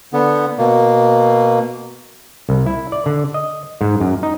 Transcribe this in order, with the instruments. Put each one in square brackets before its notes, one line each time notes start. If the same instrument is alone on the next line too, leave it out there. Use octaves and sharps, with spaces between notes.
[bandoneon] D3 B3
B2 A#3
[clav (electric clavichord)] C2
E4
D5
D3
D#5
G#2
F#2
D#4